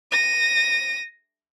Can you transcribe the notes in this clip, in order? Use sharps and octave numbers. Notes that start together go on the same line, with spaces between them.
A#6 D#7